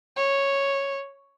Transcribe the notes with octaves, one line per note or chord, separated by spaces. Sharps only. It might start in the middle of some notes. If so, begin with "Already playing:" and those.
C#5